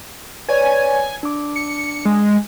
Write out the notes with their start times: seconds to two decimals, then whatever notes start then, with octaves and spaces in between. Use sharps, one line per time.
0.49 B4 C#5 D5 G#5
1.23 D4 D6
1.56 C#7
2.06 G#3